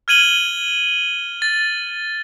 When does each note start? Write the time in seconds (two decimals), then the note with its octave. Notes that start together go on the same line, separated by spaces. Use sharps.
0.08 F6 G#6 D#7 F#7 G7
1.42 A6